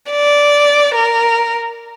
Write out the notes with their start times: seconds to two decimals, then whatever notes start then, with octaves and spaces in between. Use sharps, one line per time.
0.11 D5
0.95 A#4